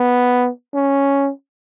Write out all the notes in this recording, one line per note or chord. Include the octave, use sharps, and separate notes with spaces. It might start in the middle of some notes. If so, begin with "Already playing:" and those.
Already playing: B3
C#4